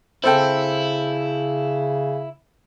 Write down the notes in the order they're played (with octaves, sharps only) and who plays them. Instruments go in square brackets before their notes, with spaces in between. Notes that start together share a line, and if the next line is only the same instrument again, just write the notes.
[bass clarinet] C#3 [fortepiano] C4 A4 G5 [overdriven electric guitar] E4